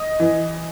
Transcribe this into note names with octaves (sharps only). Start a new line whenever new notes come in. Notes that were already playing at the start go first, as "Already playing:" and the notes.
Already playing: D#5
E3